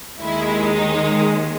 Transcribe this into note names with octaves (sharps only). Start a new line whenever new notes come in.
D#2 D#3 G#3 E4
D#4